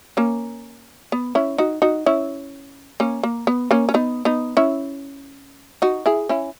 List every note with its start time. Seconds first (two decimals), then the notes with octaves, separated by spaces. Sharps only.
0.17 A#3 C#4
1.12 B3
1.35 C#4 E4
1.58 D#4 F#4
1.82 D#4 F#4
2.06 C#4 E4
3.00 A#3 C#4
3.23 A#3
3.47 B3
3.71 A#3 C#4
3.89 C#4
3.94 B3 D#4
4.25 B3 D#4
4.57 C#4 E4
5.82 D#4 F#4
6.06 E4 G#4
6.29 C#4 E4